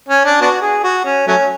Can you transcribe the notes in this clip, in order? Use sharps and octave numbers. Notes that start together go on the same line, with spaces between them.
C#4
D4
B3 D4 F#4
G#4
F#4
C#4
F#3 A3 C#4